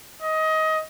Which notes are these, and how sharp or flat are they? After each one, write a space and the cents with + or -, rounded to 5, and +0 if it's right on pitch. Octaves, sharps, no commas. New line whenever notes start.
D#5 +20